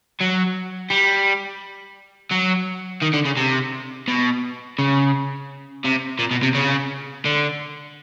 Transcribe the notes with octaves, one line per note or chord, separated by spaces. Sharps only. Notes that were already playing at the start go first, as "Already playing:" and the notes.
F#3
G3
F#3
D#3
D3
C#3
C3
B2
C#3
C3
A#2
B2
C3
C#3
D3